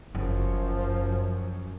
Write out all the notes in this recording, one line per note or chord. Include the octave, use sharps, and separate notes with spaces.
F#1 F#2 F3